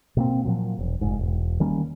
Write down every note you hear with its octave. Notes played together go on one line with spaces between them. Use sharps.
B2 A#3 C4
A#2 F3 F#3
E1
F1 G#2
E1
D#3 G3 A#3 C#4